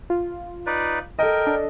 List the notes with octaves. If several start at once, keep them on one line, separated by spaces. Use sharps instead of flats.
F4
D#4 B4 D5
A4 A#4 D#5 G5
D4